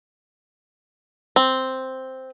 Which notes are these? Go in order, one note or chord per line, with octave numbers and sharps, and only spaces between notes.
C4